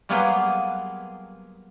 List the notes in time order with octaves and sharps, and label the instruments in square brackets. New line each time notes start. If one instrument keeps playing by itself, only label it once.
[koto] F#3 G3 A#3 B3 F4 G#4